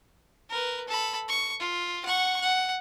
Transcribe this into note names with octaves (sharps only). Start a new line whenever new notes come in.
A#4 B4
A4 B5
C#6
F4
F#5 C#6
F#5